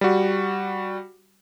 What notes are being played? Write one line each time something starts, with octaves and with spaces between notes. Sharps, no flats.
G3 F#4